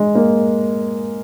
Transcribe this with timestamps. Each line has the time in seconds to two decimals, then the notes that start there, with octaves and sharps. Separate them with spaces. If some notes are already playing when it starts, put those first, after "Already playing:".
Already playing: G#3
0.15 A#3